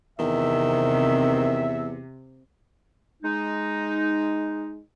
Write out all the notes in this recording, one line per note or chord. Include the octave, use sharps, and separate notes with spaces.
E2 C3 D#3 E5
G#3 D#4